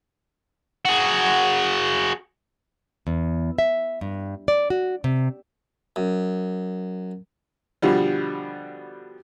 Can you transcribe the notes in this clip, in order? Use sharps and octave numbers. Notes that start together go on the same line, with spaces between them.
F#4 G#4
E2
E5
G2
D5
F#4
C3
F#2
B2 D3 F3 G3